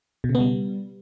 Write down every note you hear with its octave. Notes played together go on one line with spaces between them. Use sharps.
B2
C#3
B3
G3